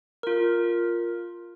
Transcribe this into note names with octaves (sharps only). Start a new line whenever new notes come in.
F4 A#4